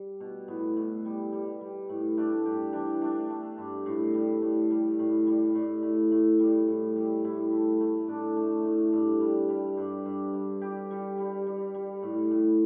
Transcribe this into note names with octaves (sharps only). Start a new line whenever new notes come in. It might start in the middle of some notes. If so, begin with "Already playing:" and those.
Already playing: G3
B2
A2 B3
A2
G3
G3
G3
A2
A3 D4
G2 G4
E3 D4
A3 D4
A3
G2
A2
G3
A2
G3
A2
G3
A2
A2
A2
G3
A2
G3
A2 E4
A3
A3
A2 D4
A3
A2
G2
G3
G3
G2
G2
G2
G3 G4
G3
G3
G3
G3
A2
A2